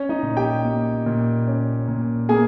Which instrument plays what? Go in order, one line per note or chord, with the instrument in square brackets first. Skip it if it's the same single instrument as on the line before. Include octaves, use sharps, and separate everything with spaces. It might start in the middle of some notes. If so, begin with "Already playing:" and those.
Already playing: [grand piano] C#4 C#5
D#4 D#5
A#2
G4 G5
A#3
A#2
C#4
A#2
A#3 G#4 G#5